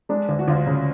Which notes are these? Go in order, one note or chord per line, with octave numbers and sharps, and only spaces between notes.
G#3 D4
D2
F#4
D2 F4
C#3